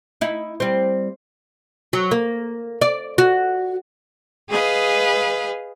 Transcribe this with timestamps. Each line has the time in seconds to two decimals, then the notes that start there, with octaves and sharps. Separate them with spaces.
0.21 D#4 E4
0.60 G3 C4
1.93 F#3
2.11 A#3
2.81 D5
3.18 F#4
4.49 G#4 B4 D#5 F5